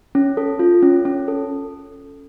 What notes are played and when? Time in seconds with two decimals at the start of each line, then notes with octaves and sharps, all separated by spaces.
0.15 C#4
0.37 A4
0.59 F4
0.83 C#4
1.05 C#4
1.28 A4